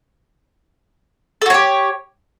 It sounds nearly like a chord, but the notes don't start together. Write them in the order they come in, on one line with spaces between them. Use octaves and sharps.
A4 F#4 C#5 G4